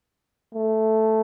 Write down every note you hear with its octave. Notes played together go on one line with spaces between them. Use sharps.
A3